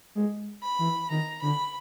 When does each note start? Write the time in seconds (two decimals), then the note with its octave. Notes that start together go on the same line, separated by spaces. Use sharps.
0.15 G#3
0.63 B5
0.79 E3
1.10 D#3 A#5
1.42 D3 B5